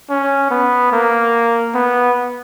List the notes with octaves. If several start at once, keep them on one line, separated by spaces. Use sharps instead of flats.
C#4
B3
A#3
B3